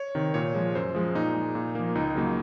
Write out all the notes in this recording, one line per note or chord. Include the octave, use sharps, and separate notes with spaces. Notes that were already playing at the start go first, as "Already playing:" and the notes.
Already playing: C#5
C3 D#3
A#2 C#5
F3 G#3
F#2 C5
F3 G#3
A#2 D#4
G#3
A#2
F3 A#3
C#2 D#4
C#3 F#3 A#3